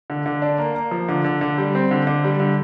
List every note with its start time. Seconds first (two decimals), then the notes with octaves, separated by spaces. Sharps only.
0.10 D3
0.26 D3
0.42 D4
0.58 A#3
0.75 A#3
0.91 F3
1.08 D3
1.24 D3
1.41 D3
1.58 G3
1.75 C4
1.91 D3
2.07 D3
2.24 G3
2.40 D3